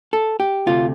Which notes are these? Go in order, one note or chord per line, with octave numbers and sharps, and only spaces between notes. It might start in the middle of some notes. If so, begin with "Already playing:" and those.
A4
G4
D2 C3 A3 F4